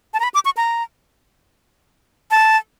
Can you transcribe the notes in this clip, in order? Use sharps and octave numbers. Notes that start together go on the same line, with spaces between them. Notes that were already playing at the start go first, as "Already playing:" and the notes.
A5
A#5
B5
D6
C#6
A#5
A5